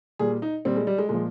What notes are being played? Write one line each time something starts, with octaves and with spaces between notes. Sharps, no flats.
A#2 G3 G#4
D#4
A#2 G3 C4
G#3
G3
G#3
A#2 F3 G#3